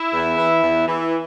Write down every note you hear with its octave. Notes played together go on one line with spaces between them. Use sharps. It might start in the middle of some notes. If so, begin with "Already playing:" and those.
Already playing: E4
E2
E3
E2
E3